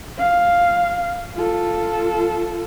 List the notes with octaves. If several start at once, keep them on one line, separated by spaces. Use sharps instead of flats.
F5
F4 A4